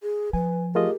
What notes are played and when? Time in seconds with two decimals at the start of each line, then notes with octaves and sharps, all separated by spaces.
0.03 G#4
0.33 F3 B4 G#5
0.75 A3 F4 G4 G#4 A#4 D#5